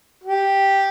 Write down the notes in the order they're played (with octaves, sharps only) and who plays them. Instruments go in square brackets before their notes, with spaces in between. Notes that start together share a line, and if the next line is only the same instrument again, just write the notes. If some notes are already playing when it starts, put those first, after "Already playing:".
[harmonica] G4